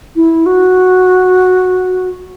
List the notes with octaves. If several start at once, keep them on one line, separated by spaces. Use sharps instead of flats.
E4
F#4